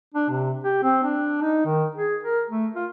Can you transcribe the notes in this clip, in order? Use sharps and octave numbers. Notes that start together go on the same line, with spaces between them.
D4
C3
G4
C4
D4
D#4
D#3
G#4
A#4
A3
F4